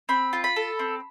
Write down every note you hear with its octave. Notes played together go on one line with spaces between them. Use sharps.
C4 B5
F4
B5
A4
C4